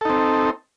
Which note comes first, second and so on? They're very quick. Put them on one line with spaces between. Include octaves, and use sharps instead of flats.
A4 D#4 C4